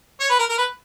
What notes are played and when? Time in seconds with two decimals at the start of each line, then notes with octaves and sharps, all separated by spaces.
0.20 C#5
0.30 B4
0.39 A#4
0.49 A#4
0.58 B4